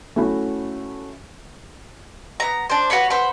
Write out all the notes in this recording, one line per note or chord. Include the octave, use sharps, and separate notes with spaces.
A3 C#4 E4 F#4 B5
B3 A#5
D4 C5
F#4 B4 C#5 B5
B4 C5 F#5 B5